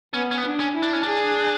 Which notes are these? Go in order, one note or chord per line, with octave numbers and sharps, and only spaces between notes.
B3 C#4
C#4
B3
D4
C#4
E4
D4
C#4
D4 G#4